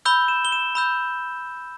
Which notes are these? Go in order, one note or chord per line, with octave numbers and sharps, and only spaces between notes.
B5 E6 G6 G7
E7
G7
E7
B5 E6 G6